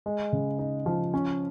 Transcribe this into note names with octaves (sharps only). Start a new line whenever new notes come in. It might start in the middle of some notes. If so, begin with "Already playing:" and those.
G#3
C#3
D#4
F3
C#4